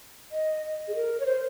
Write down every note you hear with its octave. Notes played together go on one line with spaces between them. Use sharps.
D#5
G#4
A#4
C#5
C5